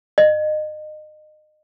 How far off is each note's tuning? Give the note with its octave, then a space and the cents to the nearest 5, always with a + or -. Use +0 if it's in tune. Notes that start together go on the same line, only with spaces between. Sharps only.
D#5 -30